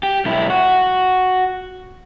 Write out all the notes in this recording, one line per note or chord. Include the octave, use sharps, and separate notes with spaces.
G4
B1 E4
F#4